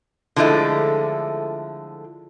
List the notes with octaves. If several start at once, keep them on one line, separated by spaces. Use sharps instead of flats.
D3 F3 G#3 A3 E4